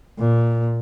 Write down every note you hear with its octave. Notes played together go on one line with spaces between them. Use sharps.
A#2